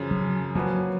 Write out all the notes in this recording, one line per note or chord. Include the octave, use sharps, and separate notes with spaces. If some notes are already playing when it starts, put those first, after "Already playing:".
Already playing: F#2 C#3 F3
F#3
F3 F#3 A#3 C#4 F#4 B4